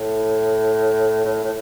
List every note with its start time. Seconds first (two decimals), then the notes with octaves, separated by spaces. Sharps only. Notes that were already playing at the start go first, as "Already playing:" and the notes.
Already playing: A2
1.25 A2
1.44 A2